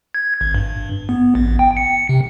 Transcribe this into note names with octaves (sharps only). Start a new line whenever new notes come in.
G#6
G#1
G2
B3
A1
G5
C#7
C3